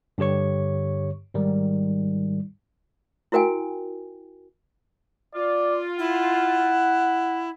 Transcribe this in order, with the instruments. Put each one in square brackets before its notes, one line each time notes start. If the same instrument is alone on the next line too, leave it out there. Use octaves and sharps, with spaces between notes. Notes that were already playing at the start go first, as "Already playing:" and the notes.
[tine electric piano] G2 D3 G4 C#5 C#6
G#2 D#3 G3
[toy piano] E4 F#4 A#4 G5 G#5
[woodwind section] F4 [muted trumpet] D5
[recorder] E4 [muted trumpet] F#5